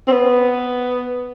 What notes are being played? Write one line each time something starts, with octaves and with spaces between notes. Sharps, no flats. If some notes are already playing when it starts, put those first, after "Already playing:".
C4
B3